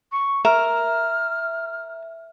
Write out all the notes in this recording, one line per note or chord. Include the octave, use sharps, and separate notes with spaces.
C#6
A#4 E5 F6